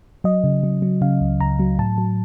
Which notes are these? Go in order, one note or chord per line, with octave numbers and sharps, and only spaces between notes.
F#3 D#5
C#3
F#3
F#3
C#3 F5
C#2
C#2 A#5
F#3
A2 A5
F#3